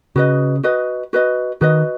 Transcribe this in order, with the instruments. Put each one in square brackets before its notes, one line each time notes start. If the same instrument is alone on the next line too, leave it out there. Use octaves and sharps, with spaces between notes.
[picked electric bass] C#3 [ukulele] F#4 B4 D#5
[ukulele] F#4 B4 D#5
F#4 B4 D#5
[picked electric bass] D#3 [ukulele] F#4 B4 D#5